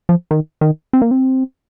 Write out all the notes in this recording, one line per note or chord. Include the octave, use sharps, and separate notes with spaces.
F3
D#3
D#3
C4
A#3
C4